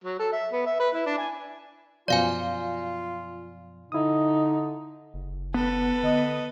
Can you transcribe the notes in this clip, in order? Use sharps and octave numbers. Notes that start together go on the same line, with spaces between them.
F#3
A4
E5
B3
E5
B4
E4
D4
G#5
F#2 B2 F3 F4 D5 F5 G#5
D3 D#4 E4 D#6
F#1
B3 A4 B4
D3 D#5